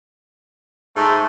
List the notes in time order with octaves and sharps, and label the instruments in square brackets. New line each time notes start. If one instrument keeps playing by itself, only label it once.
[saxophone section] G#2 [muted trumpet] A3